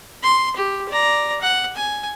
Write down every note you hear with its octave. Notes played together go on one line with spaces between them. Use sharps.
C6
G4
D5 A#5
F#5
G#5